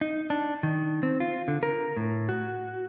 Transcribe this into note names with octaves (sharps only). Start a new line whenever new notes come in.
D#4
D4
D#3
C4
F4
D3
A#4
A2
F#4